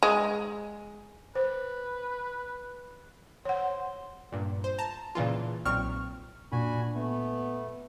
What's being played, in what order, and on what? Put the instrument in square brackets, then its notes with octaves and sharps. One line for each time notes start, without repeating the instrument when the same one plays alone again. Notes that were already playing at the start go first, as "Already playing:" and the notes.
[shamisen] G#3
[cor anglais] B4 [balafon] C5
[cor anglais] C5 [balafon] C#5 F#5
[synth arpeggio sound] G2 A#2
C5
A5 A#5
A#2 C#3 E3 F4
B1 A#2 C4 C#6 F6
[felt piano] A#2 [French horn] D4 [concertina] F#4 G#5 B5
[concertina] A3 [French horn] B3